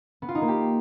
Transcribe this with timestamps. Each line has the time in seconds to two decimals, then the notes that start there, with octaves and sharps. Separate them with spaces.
0.22 B3
0.29 F4
0.35 D#4
0.41 A#3
0.48 G4